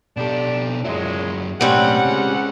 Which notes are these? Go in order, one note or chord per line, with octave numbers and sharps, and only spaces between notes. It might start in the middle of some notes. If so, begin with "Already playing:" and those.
B2 D4 G4 A4
F#2 A#2 F#3 G#3 E4
B1 A2 G3 C4 C#4 F#5
C#3 G#3